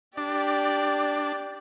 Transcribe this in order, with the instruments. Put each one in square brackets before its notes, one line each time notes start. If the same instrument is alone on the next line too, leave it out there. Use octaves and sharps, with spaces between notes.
[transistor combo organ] D4 [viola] G4 D5